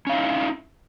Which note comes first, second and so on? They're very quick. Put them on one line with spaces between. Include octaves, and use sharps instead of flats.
C#4 F5 D#4 E4